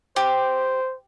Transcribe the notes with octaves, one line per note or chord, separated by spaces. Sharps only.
G4 C5